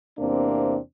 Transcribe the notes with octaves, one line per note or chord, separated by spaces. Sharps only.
E2 C3 A#3 C4 D4